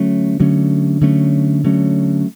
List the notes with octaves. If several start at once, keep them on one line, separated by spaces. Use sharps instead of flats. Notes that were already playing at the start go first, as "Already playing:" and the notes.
Already playing: D3 F#3 A3 C#4
D3 F#3 A3 C#4
D3 F#3 A3 C#4
D3 F#3 A3 C#4